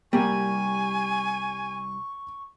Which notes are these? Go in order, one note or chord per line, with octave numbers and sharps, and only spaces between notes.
C2 G3 A#3 G4 G#5 C#6